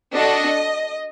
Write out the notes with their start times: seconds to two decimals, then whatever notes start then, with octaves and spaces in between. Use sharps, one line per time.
0.14 D4 F#4 A4 D#5